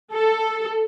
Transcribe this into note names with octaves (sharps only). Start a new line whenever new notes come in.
A4